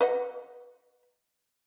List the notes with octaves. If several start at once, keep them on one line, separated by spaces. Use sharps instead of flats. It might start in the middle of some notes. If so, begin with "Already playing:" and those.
B4 D#5 F#5